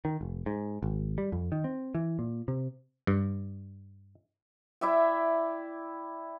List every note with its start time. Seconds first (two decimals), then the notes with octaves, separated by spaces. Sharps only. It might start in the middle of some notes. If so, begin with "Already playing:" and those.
0.05 D#3
0.21 F1
0.46 G#2
0.83 G#1
1.18 G3
1.32 F2
1.52 D#3
1.64 C4
1.95 E3
2.19 A#2
2.48 C3
3.07 G2
4.81 E4 D5 E5 G5